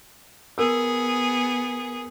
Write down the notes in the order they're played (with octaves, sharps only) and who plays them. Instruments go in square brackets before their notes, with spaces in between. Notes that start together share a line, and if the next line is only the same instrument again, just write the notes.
[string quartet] B3 G#4 [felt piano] A#4 E6